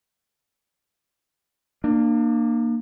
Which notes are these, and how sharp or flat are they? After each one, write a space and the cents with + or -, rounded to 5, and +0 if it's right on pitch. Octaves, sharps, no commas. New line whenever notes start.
A#3 +0 D4 +35